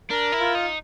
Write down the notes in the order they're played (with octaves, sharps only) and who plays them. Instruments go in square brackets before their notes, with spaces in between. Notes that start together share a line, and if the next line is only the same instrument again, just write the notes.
[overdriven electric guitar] D4 [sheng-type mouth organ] A#4
[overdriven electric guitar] E4
[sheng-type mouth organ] F4
[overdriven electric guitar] D#4